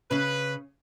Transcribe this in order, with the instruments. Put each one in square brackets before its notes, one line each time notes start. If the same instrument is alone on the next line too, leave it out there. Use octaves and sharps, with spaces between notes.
[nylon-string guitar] C#3 C#4 [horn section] B4